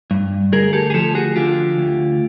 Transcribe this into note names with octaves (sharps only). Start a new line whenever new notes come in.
G2
D2 G#4 A#4
G4 A4
G#4
F3 G4 A4
F#4 G#4
D3 F4 G4
D2